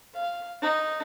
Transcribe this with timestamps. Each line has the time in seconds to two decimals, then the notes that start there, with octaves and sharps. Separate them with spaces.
0.15 F5
0.62 D#4